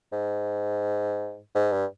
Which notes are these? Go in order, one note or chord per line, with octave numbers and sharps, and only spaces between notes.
G#2
G#2
G2